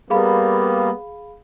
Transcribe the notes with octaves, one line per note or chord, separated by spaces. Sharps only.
G3 A#3 B3 G#4 F5 B5